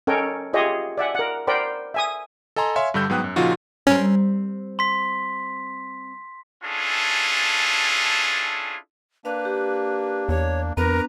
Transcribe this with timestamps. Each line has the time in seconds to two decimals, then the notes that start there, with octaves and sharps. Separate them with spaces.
0.07 C#4 A4 A#4 C#5 D#5 G5
0.53 F4 G4 G#4 C#5 D#5 E5
0.98 D5 E5 F#5 G#5
1.15 A#4 F#5
1.47 A#4 C5 D5 F#5 G5 B5
1.94 E5 G#5 D#6
2.56 A4 D#5 G#5 A#5 C6
2.76 C#5 E5 F5 G#5 C6
2.94 G2 D3 G3 E6 G6
3.10 G#2 F#3 B3 G5 D#6 F#6
3.24 F#2
3.36 A#2 C#3 F3 D#4 F4 F#4
3.87 G3 C4 C#4 A#4
4.79 C6 B6
6.64 C#4 D4 E4 F4 G#4 A4
9.25 A#3 D4 B4 F5
9.45 G4
10.29 E2 C#5
10.77 F2 B3 D4 A#4 B4 A#5